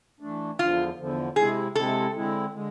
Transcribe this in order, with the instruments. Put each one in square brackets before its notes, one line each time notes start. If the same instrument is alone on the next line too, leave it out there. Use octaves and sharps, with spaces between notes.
[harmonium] E3 A3 D4
[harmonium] E2 D3 F3 [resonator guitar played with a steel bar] F4
[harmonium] E2 D3 F3
[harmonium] C3 G#3 C4 E4 [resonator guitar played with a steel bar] G#4
[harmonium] C3 G#3 C4 E4 [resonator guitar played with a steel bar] A4
[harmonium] D3 G#3 C4 E4
D3 G#3